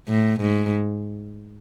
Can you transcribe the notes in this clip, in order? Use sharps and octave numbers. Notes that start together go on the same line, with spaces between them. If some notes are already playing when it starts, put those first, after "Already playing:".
A2
G#2